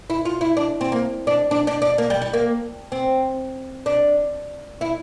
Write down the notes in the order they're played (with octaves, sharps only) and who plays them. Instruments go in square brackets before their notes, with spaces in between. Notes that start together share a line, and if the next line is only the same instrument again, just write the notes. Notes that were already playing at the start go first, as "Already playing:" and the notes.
[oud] E4
F4
E4
D4
C4
A#3
D4
D4
D4
D4
A#3
G3
G3
A#3
C4
D4
E4